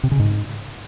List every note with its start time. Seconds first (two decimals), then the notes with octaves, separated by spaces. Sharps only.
0.03 C3
0.12 C#3
0.20 G#2